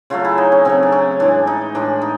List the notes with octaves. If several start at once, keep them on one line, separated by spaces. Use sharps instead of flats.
C#3 F#3 A3 F4
E4
D#4
C#4
C#3 F#3 A3 C4
D4
C#4
A2 E3 G#3 D4
D#4
A2 E3 G#3 D4
D#4